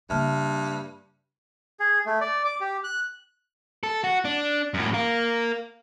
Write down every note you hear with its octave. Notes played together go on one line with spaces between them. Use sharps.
G2 C#3 A#3 E5 A5 F6
G#4
A3
D5
D6
G4
F#6
A4
F#4
D4
F#2 A2
A#4 F5